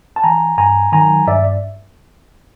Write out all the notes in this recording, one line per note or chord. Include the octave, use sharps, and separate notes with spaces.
A5
E3 G#5 A#5
G2 G#5 A#5
D#3 F#3 G#5 A#5
G2 D5 E5